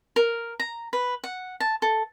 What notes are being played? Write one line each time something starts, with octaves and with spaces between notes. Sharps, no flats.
A#4
A#5
B4
F#5
A5
A4